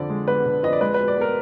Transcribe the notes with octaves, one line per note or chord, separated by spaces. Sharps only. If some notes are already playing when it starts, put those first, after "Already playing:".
Already playing: F2 D3 D5
G#3
B3 B4
D3
F2 D#5
D5
G#3 B4
B2 B4
D5
B3 A#4